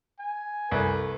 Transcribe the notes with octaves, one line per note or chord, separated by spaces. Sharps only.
G#5
C2 A3 B4